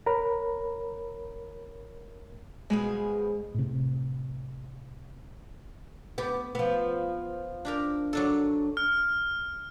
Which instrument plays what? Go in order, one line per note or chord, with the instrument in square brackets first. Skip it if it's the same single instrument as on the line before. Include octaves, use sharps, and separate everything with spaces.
[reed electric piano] A#4 C#5 A#5 B5
[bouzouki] B2 F3 G#4 [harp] G#3
[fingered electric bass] A2 C3
[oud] B3 [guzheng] G4
[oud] F3 B3
[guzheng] D4 G4 A#4
F#3 D4 A4
[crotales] F6